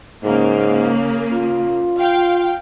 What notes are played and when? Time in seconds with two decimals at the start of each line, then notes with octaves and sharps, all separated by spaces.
0.24 G#2 C#3 A#3
1.33 F4
1.98 F5 G5